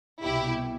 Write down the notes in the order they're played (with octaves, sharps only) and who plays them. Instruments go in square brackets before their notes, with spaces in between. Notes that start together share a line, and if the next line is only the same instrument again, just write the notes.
[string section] C2 B2 E4 G4